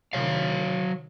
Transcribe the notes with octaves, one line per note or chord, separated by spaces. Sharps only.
C3 D#3 F#3 C#5 F5